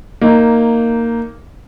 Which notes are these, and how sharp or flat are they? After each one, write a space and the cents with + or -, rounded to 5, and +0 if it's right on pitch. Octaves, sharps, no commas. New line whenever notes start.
A#3 -10 D#4 +0